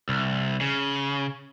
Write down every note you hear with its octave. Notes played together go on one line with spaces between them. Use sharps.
C2
C#3